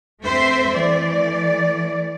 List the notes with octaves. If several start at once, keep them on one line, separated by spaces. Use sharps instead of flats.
A3 C4 C5 E5
E3 A3 D5